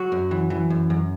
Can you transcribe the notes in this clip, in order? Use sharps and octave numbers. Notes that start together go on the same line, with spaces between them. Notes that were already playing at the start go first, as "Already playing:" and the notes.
Already playing: F#3 F#4
F#2
E3
E3
F#2
F#2